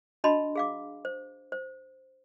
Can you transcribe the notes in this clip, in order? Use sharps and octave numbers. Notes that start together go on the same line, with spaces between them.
D4 F#4 D#5 A5 B5 C6
G#4 F5 D6
C5
C5